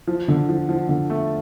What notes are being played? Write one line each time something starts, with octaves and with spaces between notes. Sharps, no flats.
F3
D3
F3
F3
D3
A3